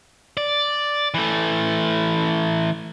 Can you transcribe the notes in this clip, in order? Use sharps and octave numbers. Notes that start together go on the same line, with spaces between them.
D5
E3 A3